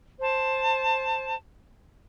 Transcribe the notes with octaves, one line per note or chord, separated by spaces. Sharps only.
C5 A5